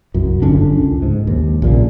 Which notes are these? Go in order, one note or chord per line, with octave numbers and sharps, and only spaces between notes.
C2 F#2
G1 D3 C#4 D4
C#2
G#2
D#2
A#1 A#2 C#3